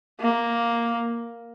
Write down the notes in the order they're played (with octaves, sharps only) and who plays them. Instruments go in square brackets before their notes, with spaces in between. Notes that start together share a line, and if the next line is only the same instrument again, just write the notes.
[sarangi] A#3